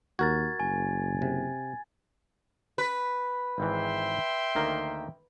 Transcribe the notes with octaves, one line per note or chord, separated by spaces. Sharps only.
D#2 F#4 A#4 G#6 A6
F#1 G#5
C3
B4
G#1 G#2 E3 E5 G5 C6
D2 D#3 A#3